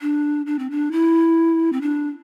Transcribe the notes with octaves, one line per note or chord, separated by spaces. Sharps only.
D4
D4
C4
D4
E4
C4
D4